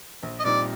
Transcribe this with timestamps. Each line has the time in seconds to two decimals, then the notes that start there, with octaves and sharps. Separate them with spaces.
0.23 A#1
0.40 D#5
0.44 A#2 G3 C4 D#4 D5